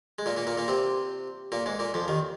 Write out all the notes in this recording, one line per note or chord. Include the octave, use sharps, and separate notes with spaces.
G#3
A#2 A#3
A#2 A#3
A#2 A#3
A#2 A#3
C3 C4
A#2 A#3
G#2 G#3
A#2 A#3
F2 F3
D#2 D#3